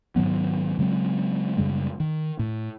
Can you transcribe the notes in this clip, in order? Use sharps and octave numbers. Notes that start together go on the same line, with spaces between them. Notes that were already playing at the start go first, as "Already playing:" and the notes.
G#2 D#3 F#3 B3
C#3 F#3 G#3 C4
F#2 C#3 G3 G#3
D#3
A2